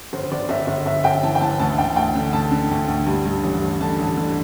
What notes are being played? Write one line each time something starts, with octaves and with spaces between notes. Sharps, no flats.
G1 C5
G1 D5
G1 E5
G1 E5
G1 E5
G1 G5
E3 A5
G5
E3 A5
D2 A5
D2 G5
D2 G5
D3
D2 A5
D3
D2
D2
G2
G2
A1
A1
D3 A5
A1
D3